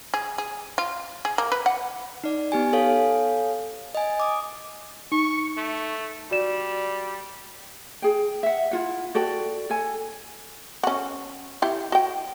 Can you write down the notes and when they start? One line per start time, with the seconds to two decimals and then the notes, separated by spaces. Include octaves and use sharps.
0.14 G#4
0.38 G#4
0.78 F4
1.25 G#4
1.38 A#3
1.52 B4
1.66 F#5
2.24 D#4 D5
2.52 B3 G4 G#5
2.73 A4 C#5 F5 G#5
3.95 D#5 G#5
4.20 D6 D#6
5.12 D#4 C#6
5.57 A3
6.31 G3 F#4 D5 E7
8.02 G#4 G5
8.43 E5 F#5
8.71 E4 F4 F#5
9.15 F#4 A4 D5 G5
9.70 A4 G#5
10.83 C#4 F#4
11.62 E4 G4
11.92 F#4 G5